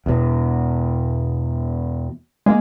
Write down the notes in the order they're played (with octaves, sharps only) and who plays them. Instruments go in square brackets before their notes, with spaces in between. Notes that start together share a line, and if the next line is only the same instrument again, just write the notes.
[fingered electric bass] E2 B2
[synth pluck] G#3 A#3